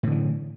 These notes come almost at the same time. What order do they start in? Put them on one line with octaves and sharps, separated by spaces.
A2 D3 E3